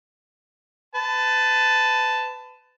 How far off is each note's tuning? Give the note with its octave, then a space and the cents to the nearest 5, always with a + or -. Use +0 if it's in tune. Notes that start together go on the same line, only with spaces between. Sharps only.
B4 +30 A5 +0